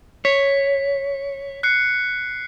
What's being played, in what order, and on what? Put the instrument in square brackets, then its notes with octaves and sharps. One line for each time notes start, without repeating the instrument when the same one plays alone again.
[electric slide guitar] C#5 [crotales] B6
[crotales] F#6 C7 C#7